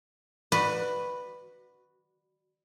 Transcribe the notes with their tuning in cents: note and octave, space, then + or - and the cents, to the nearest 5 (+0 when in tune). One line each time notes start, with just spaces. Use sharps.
F#4 -5 B4 +0 D5 +25